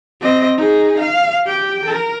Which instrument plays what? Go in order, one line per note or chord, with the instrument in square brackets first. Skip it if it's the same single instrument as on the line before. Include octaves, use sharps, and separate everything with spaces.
[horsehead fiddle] C4 D#5
D#4 G#4
F5
G4 G5
A#4